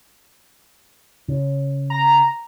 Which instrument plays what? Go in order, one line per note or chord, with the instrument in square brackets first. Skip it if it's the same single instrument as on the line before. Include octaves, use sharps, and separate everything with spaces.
[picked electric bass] C#3
[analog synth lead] A#5